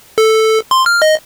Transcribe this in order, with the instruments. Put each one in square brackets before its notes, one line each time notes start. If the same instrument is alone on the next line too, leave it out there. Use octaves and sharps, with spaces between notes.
[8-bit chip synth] A4
C6
F6
D#5